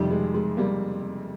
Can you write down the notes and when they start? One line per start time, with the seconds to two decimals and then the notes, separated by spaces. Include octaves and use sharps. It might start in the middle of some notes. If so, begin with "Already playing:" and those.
Already playing: F2 C3 D#3 G3
0.10 G#3
0.34 G#3
0.57 G3 A#3